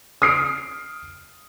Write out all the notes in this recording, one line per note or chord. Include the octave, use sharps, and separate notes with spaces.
D#6 F6 C7 D7